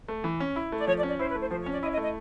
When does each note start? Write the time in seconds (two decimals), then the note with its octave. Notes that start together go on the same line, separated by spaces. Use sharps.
0.08 A3
0.24 E3
0.40 C#4
0.56 E4
0.72 A3
0.79 D5
0.87 F3 C#5
0.98 D5
1.03 C#4
1.09 D5
1.19 E4 C5
1.30 B4
1.35 A3
1.40 C5
1.51 F3 C5
1.61 C#5
1.66 C#4
1.72 D5
1.82 E4 D#5
1.92 D#5
1.97 A3
2.03 D#5